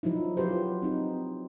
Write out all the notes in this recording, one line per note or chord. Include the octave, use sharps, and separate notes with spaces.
F3 F#3 D#4 E4
F#3 F4 G4 B4 C5
C4 D#4